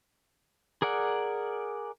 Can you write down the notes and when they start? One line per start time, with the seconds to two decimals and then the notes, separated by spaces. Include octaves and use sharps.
0.82 G#4 A#4 D5 F#5